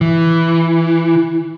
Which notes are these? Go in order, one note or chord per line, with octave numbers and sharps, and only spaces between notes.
E3